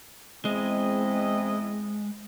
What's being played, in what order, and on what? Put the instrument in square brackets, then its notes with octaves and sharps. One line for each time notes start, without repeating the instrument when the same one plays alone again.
[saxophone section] E2 E4 D#5 [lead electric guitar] G#3 [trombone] C4